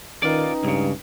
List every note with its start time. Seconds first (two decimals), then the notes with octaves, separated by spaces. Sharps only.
0.23 D#3 C#4 D#4 F4 B4 D5 G5
0.64 C#2 G2 C#3